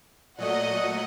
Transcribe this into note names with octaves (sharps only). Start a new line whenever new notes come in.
A#2 F#3 A3 D5 D#5 F#5